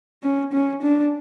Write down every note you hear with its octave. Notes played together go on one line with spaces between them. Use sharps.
C#4
C#4
D4